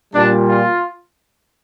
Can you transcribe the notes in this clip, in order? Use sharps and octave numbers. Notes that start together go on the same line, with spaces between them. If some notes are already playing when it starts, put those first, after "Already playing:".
A#2 G3 D4
F4